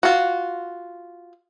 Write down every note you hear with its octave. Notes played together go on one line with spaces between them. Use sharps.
F4 F#4